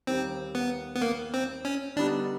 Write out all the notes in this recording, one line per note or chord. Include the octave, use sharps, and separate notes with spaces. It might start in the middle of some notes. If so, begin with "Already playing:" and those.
D#2 D#3 G3 C4
B3
B3
A#3
C4
C#4
D3 G3 B3 D4 D#4